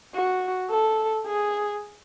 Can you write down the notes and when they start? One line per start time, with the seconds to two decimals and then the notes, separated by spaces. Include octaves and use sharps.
0.15 F#4
0.70 A4
1.27 G#4